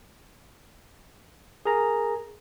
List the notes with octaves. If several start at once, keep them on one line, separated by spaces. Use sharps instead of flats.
G#4 A#4 A#5